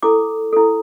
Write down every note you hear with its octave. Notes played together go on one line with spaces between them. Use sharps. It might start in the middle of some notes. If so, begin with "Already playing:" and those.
E4 A4 D6
E4 A4